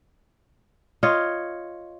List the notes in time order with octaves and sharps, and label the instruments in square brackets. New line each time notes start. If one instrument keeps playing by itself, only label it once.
[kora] F4 C#5 D#5